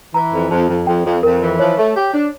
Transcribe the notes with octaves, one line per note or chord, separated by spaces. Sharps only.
E3 A#5
F2
F2 A5
F2
F2 G5
F2
F2 A#4
E3
F3 C#5
A3
G4
D4